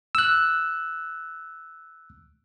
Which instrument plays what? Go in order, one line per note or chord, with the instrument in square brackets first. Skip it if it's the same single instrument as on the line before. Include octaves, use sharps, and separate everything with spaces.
[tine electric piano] E6 F#6